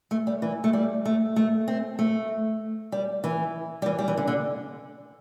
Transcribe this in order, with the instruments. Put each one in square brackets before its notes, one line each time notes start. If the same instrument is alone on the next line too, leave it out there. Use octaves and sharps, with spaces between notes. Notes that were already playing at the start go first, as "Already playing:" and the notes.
[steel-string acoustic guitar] A3
G3
E3
A3
G3
A3
A3
C4
A3
G3
E3
G3
E3
G3
E3
D3
D3